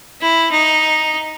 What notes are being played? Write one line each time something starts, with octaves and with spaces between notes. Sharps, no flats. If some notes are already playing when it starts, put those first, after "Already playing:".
E4
D#4